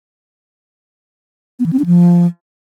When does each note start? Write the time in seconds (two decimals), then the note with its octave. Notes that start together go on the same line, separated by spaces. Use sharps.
1.59 B3
1.66 E3
1.73 C4
1.79 D4
1.86 F3